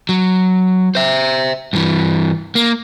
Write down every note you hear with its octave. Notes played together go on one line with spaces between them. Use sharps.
F#3
C5 E5
G2 E3
A#3